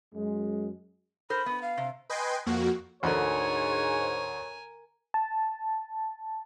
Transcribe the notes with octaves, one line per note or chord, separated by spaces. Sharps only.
F#2 G#3
A#4 C5 B5
B3
F5
C3
B4 D#5 G5 G#5 C6
F2 A#3 F#4
D2 G#2 D3 A#4 C#5 G#5
A5